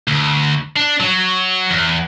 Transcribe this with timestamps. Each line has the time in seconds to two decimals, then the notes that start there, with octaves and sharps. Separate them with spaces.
0.08 D2
0.76 D4
1.00 F#3
1.70 E2